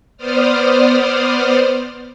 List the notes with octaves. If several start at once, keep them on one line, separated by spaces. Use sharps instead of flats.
B3 C5 D5 D#6 F6